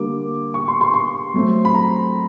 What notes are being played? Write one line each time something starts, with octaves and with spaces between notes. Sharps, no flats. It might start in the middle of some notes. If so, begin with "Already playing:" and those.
Already playing: D3 G3 A#3 D6
C#6
C6
C6
C6
F#3 A3 C4
B5
A#5